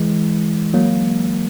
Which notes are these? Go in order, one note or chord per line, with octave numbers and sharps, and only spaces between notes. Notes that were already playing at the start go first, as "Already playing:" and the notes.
Already playing: E3 G#3
F#3 A#3